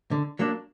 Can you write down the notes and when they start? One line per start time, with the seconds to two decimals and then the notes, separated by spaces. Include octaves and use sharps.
0.11 D3
0.39 F#3 A#3 D4